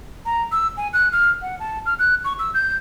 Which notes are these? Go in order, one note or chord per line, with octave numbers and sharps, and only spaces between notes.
A#5
E6
G#5
F#6
F6
F#5
A5
F6
F#6
C#6
E6
G6